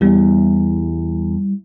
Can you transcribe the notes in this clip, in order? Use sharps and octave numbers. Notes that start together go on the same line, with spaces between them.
E2 G3 E4